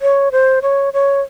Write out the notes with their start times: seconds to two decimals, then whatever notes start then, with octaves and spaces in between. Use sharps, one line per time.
0.02 C#5
0.32 C5
0.62 C#5
0.93 C#5